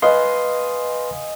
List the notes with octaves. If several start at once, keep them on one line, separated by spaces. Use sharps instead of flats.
B4 D#5 F5 G#5 C6